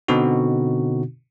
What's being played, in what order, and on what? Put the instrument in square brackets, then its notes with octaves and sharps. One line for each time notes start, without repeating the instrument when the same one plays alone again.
[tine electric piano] B2 D3 C4 D#4 F#4